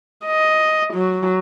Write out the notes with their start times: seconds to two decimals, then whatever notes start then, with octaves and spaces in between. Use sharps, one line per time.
0.25 D#5
0.93 F#3